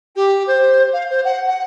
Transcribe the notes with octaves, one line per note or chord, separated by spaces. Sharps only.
G4
C5
F5
C5
F#5
F#5